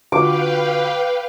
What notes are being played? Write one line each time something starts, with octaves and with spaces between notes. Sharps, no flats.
D3 F4 F#4 B4 F5 G5 D6